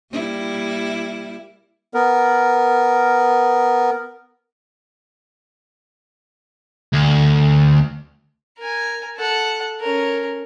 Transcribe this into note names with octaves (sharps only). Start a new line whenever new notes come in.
G3 A#3 E4
B3 A#4
D2
A#4 G#5
A4 F#5
C#4 A#4